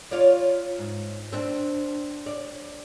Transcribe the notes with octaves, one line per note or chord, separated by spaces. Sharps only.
F4 C#5 D5
G#2
C4 D4
D5